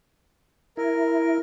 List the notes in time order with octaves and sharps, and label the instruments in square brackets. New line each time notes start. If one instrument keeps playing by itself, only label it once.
[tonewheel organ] E4 [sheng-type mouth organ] A#4